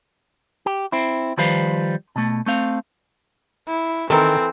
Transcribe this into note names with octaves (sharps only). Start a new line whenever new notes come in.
G4
C4 E4
D#3 F3 G3 B4 C5 F5
B2 A3
A3 C4 F5
E4
D#3 E3 C4 A4 A#4